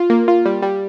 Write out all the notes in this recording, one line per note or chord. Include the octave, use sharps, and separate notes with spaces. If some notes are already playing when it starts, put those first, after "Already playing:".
Already playing: F4
A#3
F4
G3
G3